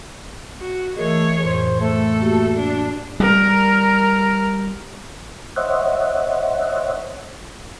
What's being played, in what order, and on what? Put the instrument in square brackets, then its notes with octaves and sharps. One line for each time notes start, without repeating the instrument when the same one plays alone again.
[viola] F#4
[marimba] E3 A#4 D#5 [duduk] A3 [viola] G#4 C#5
[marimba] F2 A2 [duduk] C5
[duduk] A3 [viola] A4
[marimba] A#3 F#4 G4
[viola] D4
[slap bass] G3 [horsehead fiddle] A#4
[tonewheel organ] C5 C#5 D#5 E5 F#5